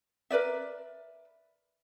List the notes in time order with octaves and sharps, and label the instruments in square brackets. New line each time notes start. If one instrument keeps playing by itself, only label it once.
[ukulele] A#4 B4 D5 E5